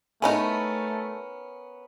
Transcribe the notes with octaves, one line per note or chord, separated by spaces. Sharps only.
A3 B3 C#4 D#4 E4 G#4 A#4